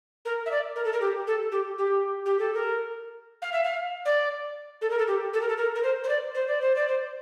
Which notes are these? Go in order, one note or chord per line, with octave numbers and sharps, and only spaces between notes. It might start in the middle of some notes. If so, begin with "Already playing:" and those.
A#4
E5
D5
A#4
A4
A#4
G4
A4
G4
G4
G4
A4
A#4
F5
E5
F5
D5
A4
A#4
A4
G4
A4
A#4
A4
A#4
A#4
C5
C5
D5
C5
D5
C5
D5
C5